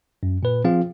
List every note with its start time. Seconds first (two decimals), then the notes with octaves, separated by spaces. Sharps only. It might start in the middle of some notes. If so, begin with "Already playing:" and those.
0.23 F#2
0.43 A#2 B4
0.64 F3 C4 F4 G#4 F5